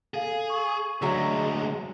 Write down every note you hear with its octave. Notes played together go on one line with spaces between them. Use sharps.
G#4 A4 F5
C#6
D2 F#3 G#3 G#4 E5